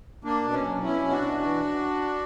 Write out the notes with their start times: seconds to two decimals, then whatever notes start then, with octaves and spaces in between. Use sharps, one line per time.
0.24 A#3 D4
0.43 B2
0.53 C#4
0.63 F#3
0.83 B2 C#4 E4
1.02 B2
1.11 D4 F#4
1.22 B2
1.41 E3